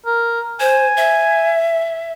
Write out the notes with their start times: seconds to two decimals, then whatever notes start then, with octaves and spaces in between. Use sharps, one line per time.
0.06 A#4
0.60 C5 G#5
0.97 E5